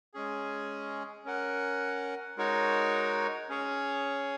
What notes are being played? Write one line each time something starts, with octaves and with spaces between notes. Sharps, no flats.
G#3 C#4 G#4
C#4 A#4 F#5
G#3 D#4 F#4 A#4 C#5
C#4 G#4 C#5